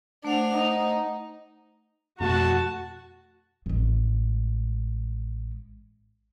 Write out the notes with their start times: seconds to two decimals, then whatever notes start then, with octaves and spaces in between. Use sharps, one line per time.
0.25 A3 D4 C5 F#5 F7
0.55 D#4
2.20 F2 B2 A3 F#4 A5
3.66 A1 G#3